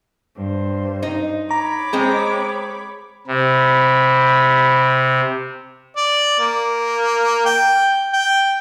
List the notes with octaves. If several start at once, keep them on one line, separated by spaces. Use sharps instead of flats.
G2 C5
D#4
C#5 A#5 B5 D6
G#3 C4 G#4
C3 B5
D5
A#3
G5
G5